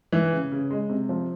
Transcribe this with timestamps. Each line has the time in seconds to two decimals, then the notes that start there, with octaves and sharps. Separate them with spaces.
0.12 E3
0.32 C#3
0.51 C#3
0.71 G#3
0.90 C3
1.09 F3